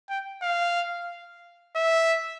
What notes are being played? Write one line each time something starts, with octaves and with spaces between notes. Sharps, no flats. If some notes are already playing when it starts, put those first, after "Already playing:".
G5
F5
E5